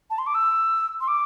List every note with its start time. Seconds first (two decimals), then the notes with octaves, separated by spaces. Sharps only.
0.10 A5
0.18 C6
0.26 D6
0.34 E6
1.00 C6
1.08 D6